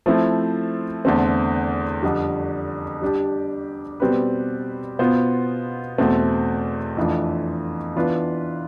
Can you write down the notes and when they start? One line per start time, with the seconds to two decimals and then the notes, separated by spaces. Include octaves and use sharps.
0.06 F3 A3 C4 E4
1.05 E2 D3 A3 C4
2.02 F2 D3 G3
3.02 G3 D4 G4
4.00 B2 G3 C4 G4 B4
4.99 B2 B3 F4 C5
5.98 E2 B2 A3 C4
6.97 F2 E3 A3 D4 F4
7.96 E3 B3 D4 F4 B4